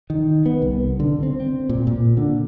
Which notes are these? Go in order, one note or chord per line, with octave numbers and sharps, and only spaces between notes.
D#3
B3
C2
D3
C4
C4
A#2
A#2
D3